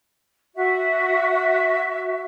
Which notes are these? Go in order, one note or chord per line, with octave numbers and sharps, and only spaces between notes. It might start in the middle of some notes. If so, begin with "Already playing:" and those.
F#4 E5